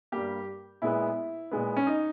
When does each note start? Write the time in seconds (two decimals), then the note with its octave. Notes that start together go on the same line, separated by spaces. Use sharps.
0.12 G2 G3 A#3 G4
0.82 A#2 G#3 B3 E4
1.51 A#2 G#3 B3
1.77 C#4
1.87 D#4